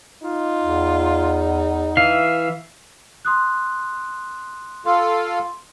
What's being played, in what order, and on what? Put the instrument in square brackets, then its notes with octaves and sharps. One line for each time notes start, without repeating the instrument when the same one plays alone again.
[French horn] D#4 [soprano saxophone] F4
[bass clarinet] E2
[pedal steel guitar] E3 F5 [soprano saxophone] E5
[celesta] C6 D#6 F#6
[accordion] F4 A4 F5 [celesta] C6